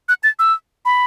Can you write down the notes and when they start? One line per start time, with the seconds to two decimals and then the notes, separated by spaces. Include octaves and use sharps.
0.09 F#6
0.24 A6
0.39 E6
0.85 B5